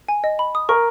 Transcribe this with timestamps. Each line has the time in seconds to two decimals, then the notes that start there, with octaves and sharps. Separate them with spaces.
0.09 G#5
0.24 D#5
0.39 B5
0.55 D#6
0.69 A#4 C#6